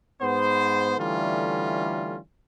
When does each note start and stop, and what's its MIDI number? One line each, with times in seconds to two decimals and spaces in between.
0.21 0.93 44
0.21 0.93 59
0.21 0.93 72
0.97 2.17 50
0.97 2.17 52
0.97 2.17 55
0.97 2.17 57
0.97 2.17 61
0.97 2.17 65